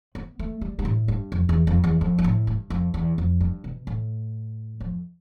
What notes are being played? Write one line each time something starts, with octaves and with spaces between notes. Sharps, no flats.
B3
A3
G3
G2
A2
G2
F2
E2
F2
E2
F2
G2
A2
G2
F2
E2
F2
G2
B2
A2
F2